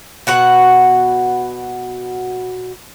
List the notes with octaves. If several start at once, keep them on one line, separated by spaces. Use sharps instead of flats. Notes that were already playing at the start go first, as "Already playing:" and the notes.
B2 F#4 F#5